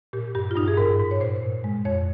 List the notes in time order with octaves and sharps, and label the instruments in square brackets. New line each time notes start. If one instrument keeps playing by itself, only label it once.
[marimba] A#2 G4
G2 G4
F4
G2 D#4
G#4
G#2 A#4
G#2
C#5
A#2 C5
A#2
G#3
F2 C#5